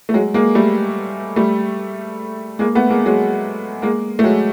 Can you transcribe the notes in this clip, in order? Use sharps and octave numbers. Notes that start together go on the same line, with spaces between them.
A3
F#3 G#3
G#3 A#3
G3 A3
G3 A3
G#3 A#3
A3 B3
G#3 A#3
F#3 G#3
G#3 A#3
A3
F#3 G#3